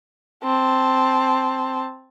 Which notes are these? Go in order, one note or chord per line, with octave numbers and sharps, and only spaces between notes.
C4 A5